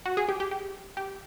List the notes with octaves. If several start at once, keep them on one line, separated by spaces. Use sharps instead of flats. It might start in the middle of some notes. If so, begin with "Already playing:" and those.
F#4
G#4
G4
G4
G4
G4